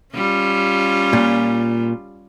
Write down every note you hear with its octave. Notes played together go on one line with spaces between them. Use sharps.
G3 C#4 F4
A#2